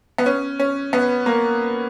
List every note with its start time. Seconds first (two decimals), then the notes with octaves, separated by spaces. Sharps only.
0.18 B3
0.26 C#4
0.60 C#4
0.93 B3
1.26 A#3